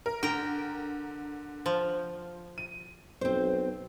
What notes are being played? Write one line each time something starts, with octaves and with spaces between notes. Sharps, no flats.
A#4
D3 A#4 G5
F3
D#7
B1 C4 C5